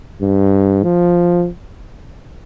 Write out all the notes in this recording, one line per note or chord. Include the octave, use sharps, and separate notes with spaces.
G2
F3